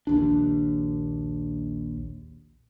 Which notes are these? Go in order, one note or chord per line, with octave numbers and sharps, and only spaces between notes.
A#1 D#2 D4